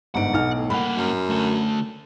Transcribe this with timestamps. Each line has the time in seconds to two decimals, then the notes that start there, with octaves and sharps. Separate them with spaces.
0.15 G1 G#2 F#5 D7
0.34 B1 D#4 F6
0.51 A2
0.70 G2 A#3 F#5 B5
0.97 F#2
1.30 D3 A3